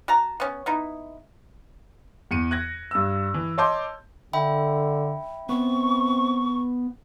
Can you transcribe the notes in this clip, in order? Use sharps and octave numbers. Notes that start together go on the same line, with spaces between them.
F#4 A5 A#5
B3 C#4
B3 D#4 E4
E2 C#7 D#7
F#6 G#6 A#6
G2 E6
E3
C#5 D#5 A5 C6 D6 G6
D3 E5 G5 B5
B3 C4 C#6